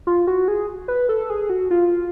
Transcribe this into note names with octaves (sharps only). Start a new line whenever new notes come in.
F4
F#4
G#4
B4
A4
G#4
F#4
F4